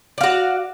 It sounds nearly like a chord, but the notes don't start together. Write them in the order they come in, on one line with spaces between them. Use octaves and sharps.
D5 F5 F#4